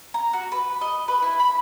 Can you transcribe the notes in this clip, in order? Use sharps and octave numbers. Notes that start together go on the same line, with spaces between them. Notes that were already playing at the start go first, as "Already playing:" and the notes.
A#5
F#4
B4
D#5
B4
E4
B5